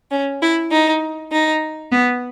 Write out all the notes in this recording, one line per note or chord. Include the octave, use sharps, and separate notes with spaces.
C#4
E4
D#4
D#4
B3